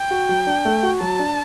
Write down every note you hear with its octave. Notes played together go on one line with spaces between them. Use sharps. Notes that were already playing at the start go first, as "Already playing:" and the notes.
Already playing: G5
F#4
F#3
D4
A3
F#4
F#3 A5
D4